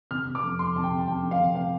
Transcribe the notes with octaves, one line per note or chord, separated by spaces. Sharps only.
C3 F6
C3
D6
F2
F2 C6
C3 A5
G5
C3
A5
F2 G5
F2
F5
C3
C3 F5